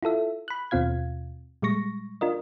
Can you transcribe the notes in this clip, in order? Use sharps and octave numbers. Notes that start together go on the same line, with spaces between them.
E4 F4 A4 E5
B5 F#6
D#2 B2 C4 F4 F5 G#6
A#2 G3 G#3 C#6 A#6
D4 F4 A#4 D#5